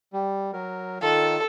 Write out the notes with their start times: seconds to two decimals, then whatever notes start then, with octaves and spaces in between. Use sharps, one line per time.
0.13 G3
0.53 F#3 A#4
1.02 D#3 F4 A4